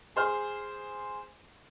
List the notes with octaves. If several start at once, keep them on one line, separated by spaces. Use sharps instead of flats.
G#4 C5 F6